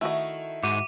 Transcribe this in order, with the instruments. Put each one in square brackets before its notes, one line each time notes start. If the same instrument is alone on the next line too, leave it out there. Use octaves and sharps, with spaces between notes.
[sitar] D#3 E4 [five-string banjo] A3 F#4 D#5
[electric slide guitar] G#2 [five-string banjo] F#4 [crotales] D6 D#7